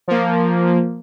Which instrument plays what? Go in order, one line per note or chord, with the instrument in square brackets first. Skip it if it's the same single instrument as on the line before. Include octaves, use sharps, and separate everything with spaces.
[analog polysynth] F3 A#3